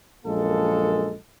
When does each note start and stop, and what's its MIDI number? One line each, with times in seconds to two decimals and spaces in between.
0.25 1.13 34
0.25 1.13 42
0.25 1.13 56
0.25 1.13 58
0.25 1.13 69